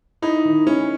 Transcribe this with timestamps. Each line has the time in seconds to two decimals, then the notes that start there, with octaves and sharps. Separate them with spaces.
0.22 D#4 E4
0.45 D#3
0.67 C#4 E4